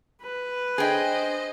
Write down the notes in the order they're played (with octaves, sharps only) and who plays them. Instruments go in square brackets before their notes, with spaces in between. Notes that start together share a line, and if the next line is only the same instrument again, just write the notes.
[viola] B4
[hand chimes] D4 G#5 [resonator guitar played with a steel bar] G#4 G5 [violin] C5 D#5